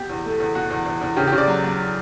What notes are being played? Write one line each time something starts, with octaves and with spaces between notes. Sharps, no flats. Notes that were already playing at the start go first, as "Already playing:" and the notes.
Already playing: B2 G4
E2
A3
E2
B2 F#4
E2
E2
E2
C#3 G4
G4
C#3
D5
F#3
F#3